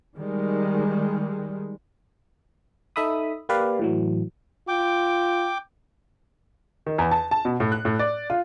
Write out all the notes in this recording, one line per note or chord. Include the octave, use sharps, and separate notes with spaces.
D#3 G3 G#3
D#4 A4 E5 B5 D#6
A#3 G4 B4 D5 F5
A2 E3 F#3
F4 G5 D6
D#3
E2
A5
A5
B2
A2
F#6
A2
D5
F4